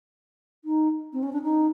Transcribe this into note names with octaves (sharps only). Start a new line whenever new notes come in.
D#4
C4
C#4
D4
D#4